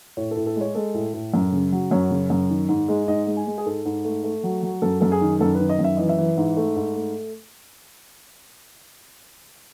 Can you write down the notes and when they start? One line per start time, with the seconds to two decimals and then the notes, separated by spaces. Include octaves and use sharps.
0.17 A2 C#5
0.31 A4
0.36 A2
0.46 A4
0.56 G#3 C#5
0.75 G#3 A4
0.94 A2
1.14 A2
1.34 F#2
1.52 C#3
1.72 F#3
1.91 F#2 C#5
2.11 C#3
2.30 F#2
2.50 D#3
2.69 G#2
2.88 G#3
3.08 G#2 D#5
3.27 G#3
3.37 G#5
3.47 G#3
3.58 G#4
3.66 G#2 A4
3.85 G#2
4.05 A3
4.24 A3
4.44 F#3
4.63 F#3
4.82 F#2 A4
5.01 F#2 A4
5.12 G#4
5.21 D#3
5.40 F#2 A4
5.55 D#3 B4
5.69 D#5
5.79 F#2
5.84 E5
5.97 E3 D#5
6.09 E5
6.18 E3
6.37 G#2
6.57 A3
6.76 G#2
6.96 A3